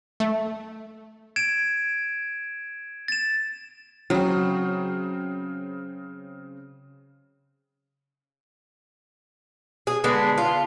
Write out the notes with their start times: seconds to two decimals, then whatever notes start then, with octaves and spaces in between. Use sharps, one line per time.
0.20 A3
1.36 G#6 D7 E7
3.08 A6 E7
4.10 C#3 F#3 C4
9.87 G#4
10.04 D3 G#3 B3 D4
10.38 F4